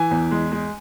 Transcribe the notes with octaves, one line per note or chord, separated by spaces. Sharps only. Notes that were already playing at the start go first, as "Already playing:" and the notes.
Already playing: E3 G#5
E2
G#3
G#3